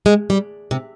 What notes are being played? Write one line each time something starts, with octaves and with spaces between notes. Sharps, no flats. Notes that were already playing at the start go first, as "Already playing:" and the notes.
G#3
G3
C3